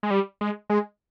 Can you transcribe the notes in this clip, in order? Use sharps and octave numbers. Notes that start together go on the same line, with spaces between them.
G#3
G3
G#3
G#3